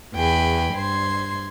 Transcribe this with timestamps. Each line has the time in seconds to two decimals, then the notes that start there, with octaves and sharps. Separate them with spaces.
0.14 E2 G#4 G5 G#5 B5
0.74 G2 C5 C6 G#6